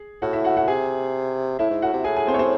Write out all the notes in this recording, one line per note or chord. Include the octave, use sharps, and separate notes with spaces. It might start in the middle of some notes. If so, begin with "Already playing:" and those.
Already playing: G#4
A2 F#4 F#5
E4 E5
F#4 F#5
F#4 F#5
C3 G#4 G#5
A2 E4 E5
G#2
A2 F#4 F#5
C3
A2 G#4 G#5
G#4 G#5
C4 C5
C#5
C4 C5